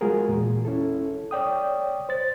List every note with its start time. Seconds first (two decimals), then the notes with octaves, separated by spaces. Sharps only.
0.01 G#3 F4 F#4 G#4 A#4
0.28 E2 A#2
0.65 C#4 E4 A4
1.31 C#5 D5 G5 D#6
2.09 C5 A6